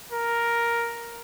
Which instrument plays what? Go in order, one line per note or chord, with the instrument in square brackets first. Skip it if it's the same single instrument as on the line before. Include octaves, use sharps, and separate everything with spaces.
[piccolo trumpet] A#4